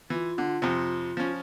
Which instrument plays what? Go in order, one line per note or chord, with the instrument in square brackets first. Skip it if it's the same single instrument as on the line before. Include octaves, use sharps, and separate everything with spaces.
[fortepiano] E3 [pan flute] F4
[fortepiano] D3
F2 C3
F3 C#4